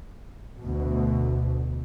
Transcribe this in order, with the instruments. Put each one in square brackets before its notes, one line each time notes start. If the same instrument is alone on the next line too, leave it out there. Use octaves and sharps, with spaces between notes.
[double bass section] D2 B2